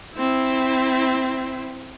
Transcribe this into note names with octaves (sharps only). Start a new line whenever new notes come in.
C4 E4